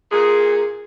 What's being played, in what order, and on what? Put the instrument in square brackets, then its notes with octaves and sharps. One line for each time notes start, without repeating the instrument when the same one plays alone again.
[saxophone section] A#2 G#4